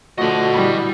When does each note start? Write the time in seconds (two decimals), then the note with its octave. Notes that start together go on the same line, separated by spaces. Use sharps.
0.18 D3 F3 A3 F#4 D#5 F#5
0.54 E3 G3 B5